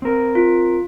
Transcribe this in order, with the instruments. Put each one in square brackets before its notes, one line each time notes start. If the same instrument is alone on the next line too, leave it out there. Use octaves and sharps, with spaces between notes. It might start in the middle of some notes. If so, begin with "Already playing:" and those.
[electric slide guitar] C4 A#4
[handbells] F4